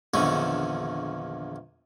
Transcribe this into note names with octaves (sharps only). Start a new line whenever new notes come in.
A#1 E2 D3 D#3 C#4